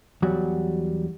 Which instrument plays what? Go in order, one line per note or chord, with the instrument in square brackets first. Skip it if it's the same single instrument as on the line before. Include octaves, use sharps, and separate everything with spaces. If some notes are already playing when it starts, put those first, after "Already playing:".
[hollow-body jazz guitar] E2 F#3 G3 F#4